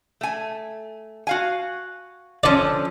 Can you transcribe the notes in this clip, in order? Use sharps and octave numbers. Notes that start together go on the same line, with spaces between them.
A3 G#5
F#4 F5 G#5
D3 F3 C#4 D5 A5